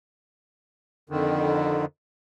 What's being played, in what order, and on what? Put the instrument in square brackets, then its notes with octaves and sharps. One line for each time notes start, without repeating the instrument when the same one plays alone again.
[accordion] F2 D3 D#3